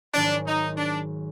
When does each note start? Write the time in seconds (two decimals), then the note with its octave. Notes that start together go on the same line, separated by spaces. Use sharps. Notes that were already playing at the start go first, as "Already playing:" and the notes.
0.14 G#1 G#2 D#3 F#3 D4
0.47 D#4
0.78 D4